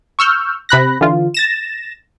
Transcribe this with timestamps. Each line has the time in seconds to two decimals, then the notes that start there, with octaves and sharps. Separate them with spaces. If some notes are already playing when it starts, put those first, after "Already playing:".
0.19 C#6 E6 F6 G6
0.69 C3 B5 F#6 A#6
1.01 D3 E3 F4
1.34 A6 A#6 E7